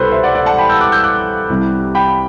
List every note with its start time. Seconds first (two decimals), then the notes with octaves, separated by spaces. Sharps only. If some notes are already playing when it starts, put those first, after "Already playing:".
Already playing: C2 B2 G3 A4 B4 C5
0.12 C5 E5
0.23 D5 F#5
0.35 D5 F#5
0.46 F#5 A5
0.58 G5 B5
0.69 E6 G6
0.81 D6 F#6
0.92 E6 G6
1.04 D6 F#6
1.49 C2 C3 G3
1.95 G5 B5